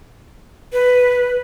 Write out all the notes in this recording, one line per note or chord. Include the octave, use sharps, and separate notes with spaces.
B4